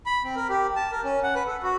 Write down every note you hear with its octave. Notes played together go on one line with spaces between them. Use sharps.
B5
C4
A#4
G4
A5
A#4
C#4
F#5
B4
A4
F#4